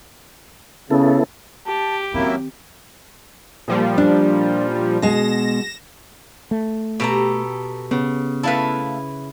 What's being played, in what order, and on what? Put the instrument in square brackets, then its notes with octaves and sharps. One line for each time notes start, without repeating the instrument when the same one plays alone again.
[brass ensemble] C#3 [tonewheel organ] B3 E4 A4
[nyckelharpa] G4 [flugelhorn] A5
[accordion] F#2 A#3 E4 [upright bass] D#3 C4 [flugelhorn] F#3
[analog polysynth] A#2 F3 G3
[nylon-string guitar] D4
[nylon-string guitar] B2 G#3 [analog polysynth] A#6 E7
[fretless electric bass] A3
[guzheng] B2 [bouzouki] G4 A4 A#5
[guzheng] C#3 [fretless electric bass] B3
[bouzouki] A3 F5 A5 [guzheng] E4 B4